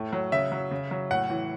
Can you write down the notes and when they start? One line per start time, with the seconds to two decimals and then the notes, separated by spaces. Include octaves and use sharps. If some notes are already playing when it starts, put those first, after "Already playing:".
Already playing: A2 A3
0.13 F#3
0.32 C#3 E5
0.52 F#3
0.71 C#3
0.91 F#3
1.10 A2 F#5
1.30 E3